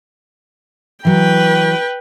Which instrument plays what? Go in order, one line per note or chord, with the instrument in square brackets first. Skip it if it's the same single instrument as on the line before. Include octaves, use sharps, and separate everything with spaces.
[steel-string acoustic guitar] E3 F#3 [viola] B4 G5